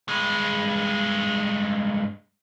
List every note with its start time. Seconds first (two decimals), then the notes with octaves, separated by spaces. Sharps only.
0.08 G2 G#3